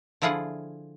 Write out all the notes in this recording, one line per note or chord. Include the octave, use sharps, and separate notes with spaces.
D3 F3 E4 F4 G#4 F#5